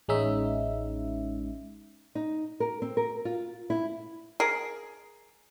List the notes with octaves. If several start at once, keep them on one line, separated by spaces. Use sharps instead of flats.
A1 G#3 C#4 D#4 E5
D#4
A#4
C4
A#4
F4
E4
G#4 A#4